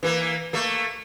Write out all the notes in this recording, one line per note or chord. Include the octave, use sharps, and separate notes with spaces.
E3 A#3
A3 A#3